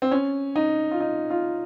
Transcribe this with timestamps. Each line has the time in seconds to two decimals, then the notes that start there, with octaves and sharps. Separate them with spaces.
0.02 C4
0.11 C#4
0.56 D#4
0.91 F4
1.00 D#4
1.30 F4